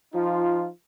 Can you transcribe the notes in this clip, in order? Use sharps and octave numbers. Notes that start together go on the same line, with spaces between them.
F3 D#4 F4